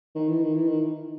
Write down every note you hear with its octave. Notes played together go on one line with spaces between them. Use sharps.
D#3
E3
D#3
E3
D#3